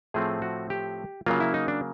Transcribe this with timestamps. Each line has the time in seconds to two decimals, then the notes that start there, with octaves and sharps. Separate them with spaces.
0.14 A2 F3 A3 C4 G#4
0.42 F#4
0.70 G4
1.26 C#3 F#3 A#3 F4
1.40 E4
1.54 D#4
1.68 D4